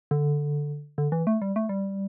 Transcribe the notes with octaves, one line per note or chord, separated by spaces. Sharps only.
D3
D3
E3
A3
G3
A3
G3